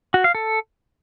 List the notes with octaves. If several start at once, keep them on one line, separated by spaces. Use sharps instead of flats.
F#4
F5
A4